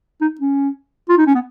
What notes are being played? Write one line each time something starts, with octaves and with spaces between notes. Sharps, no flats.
D#4
C#4
F4
D#4
C#4
B3